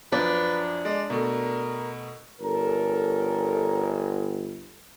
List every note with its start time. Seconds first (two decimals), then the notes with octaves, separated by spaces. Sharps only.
0.12 F#2 F3 D4 B4
0.85 G#3 D5
1.10 B2 A3 A#4
2.41 G1 C#4 A4 A#4